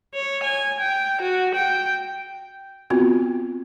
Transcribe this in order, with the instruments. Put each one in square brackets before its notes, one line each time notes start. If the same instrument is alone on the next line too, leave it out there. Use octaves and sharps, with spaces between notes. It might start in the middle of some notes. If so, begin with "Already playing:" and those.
[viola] C#5
G#5
G5
F#4
G5
[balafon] B3 C4 F4 F#4